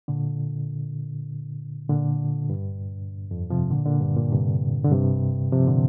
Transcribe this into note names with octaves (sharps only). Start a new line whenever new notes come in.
A#2 D3
A#2 D3
G2
F2
C3 F3
A#2 D3
A#2 D3
G2
A#2
G2 C3
D3
G2 C3
C3 F3
A#2 D3